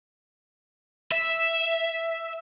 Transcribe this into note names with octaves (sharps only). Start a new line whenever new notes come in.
E5